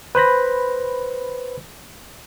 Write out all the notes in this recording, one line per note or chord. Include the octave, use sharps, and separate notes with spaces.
B4 C5 B5 A#6